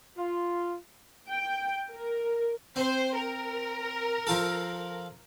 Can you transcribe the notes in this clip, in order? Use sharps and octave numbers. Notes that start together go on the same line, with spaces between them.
F4
G5
A#4
C4 C5
A#4
F3 F4 A4